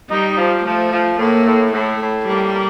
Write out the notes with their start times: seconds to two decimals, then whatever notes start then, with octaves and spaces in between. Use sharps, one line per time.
0.10 G3 D#4
0.37 F3
0.64 F3 A3
0.92 F3
1.18 A2 A#3
1.46 A2
1.72 A2 A3
2.00 A2
2.27 G3 A#3
2.54 A#3